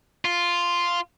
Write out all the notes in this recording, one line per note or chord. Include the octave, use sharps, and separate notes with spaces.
F4